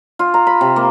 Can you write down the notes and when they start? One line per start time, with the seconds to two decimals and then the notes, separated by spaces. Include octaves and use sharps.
0.19 F4
0.34 A#5
0.47 B5
0.61 C3
0.76 A#3